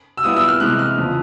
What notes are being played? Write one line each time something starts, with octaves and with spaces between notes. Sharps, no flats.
E6
A#2 G3 B3 E4 D#6
E6
F6
C3 E3 G#3 F#6
F6
E2 C#3 F3